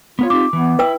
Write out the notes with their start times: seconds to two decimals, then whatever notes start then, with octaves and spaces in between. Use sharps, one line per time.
0.19 B3 F4 A#4 C#5
0.30 C4 D#4 G4 D6
0.53 E3 B3
0.79 E4 B4 G5 E6